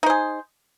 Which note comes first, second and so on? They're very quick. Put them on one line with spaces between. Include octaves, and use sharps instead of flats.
D#4 C5 G#4